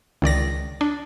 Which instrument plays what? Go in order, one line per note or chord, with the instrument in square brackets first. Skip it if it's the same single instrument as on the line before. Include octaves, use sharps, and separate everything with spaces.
[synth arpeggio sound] C#2 D#3 D5 A#6
D4